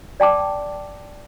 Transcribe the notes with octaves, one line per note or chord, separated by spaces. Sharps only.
D5 G5 A5 D6